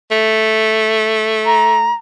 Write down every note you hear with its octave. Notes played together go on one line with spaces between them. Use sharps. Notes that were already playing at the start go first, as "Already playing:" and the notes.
A3
A#5